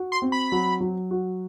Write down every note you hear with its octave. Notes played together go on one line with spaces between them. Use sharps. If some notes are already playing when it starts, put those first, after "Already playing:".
Already playing: F#4
C6
C4
B5
F#3
F#3
F#4